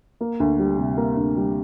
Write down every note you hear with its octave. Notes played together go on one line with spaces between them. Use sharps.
A#3
D2
G3
C3
A#3
D2
G3